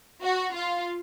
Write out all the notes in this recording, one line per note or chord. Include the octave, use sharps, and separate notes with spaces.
F#4
F4